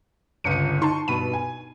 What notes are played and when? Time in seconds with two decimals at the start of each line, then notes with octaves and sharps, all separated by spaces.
0.44 G1 C#2 C#7 D#7
0.82 D#4 A5 C6 C#6
1.08 G2 B2 B5 D#7
1.34 G#5